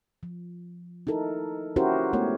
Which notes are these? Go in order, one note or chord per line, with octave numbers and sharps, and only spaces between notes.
F3
D#4 E4 A4 A#4
C#4 E4 F#4 G4 A#4 C5
G#3 A3 B3 A#4 C#5